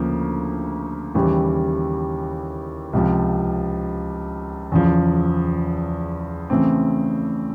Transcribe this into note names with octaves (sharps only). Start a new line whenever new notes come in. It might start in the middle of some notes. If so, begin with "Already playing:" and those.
Already playing: D2 C#3 F3 A#3
D#2 C#3 E3 G3
C#2 C3 F3
E2 C#3 F3
C#3 E3 A3 C4